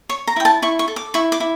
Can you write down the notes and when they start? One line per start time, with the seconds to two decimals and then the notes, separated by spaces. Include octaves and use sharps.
0.09 C#5 C#6
0.27 A#5
0.36 E4 G5
0.45 A5
0.62 E4 C#6
0.79 C#6
0.88 A4
0.96 D6
1.14 E4 C#6
1.32 D6
1.40 E4